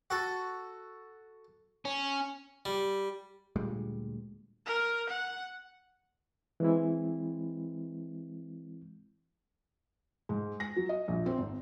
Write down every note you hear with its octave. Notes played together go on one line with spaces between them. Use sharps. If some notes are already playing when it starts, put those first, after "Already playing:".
F#4 A4
C#4
G3
D2 A#2 G3 G#3
A#4
F#5
E3 G#3 C4 E4
G#2
A#6
F#3
D#5
A#1
C4
G#1